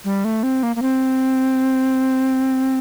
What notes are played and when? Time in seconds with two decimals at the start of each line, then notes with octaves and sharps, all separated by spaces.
0.05 G3
0.25 A3
0.43 C4
0.63 A#3
0.76 A#3
0.82 C4